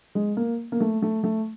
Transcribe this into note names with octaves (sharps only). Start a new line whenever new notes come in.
G#3
A#3
A#3
A3
A3
A3